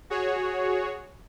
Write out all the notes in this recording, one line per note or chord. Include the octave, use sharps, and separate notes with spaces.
F#4 G#4 C#5